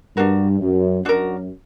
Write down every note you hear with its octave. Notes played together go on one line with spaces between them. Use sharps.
G2 D4 F#4 A#4
F#2
F#2 D4 F#4 A#4